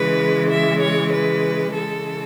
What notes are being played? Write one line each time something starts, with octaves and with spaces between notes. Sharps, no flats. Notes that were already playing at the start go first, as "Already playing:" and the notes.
Already playing: C#3 E3 G#3 B4
E5
C#5
B4
C#3 E3 G#3 A4